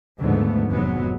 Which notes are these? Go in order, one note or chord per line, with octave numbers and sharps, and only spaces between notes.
D#2 G#2 D3 F3 A3 B3
F1 E2 G#2 F#3 G#3 B3